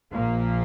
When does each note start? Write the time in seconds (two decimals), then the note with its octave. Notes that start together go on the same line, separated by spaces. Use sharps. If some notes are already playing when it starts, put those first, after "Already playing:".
0.12 A#1 A#2 F3 A#3